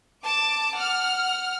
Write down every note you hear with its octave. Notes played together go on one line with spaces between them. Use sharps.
A5 D6
F#5 F6